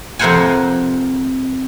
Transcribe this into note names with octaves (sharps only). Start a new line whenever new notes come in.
F2 C3 A#4 C5 F#5 G#5